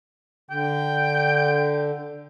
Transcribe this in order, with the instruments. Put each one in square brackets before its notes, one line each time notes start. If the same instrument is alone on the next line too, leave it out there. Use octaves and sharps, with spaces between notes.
[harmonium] D3 [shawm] G5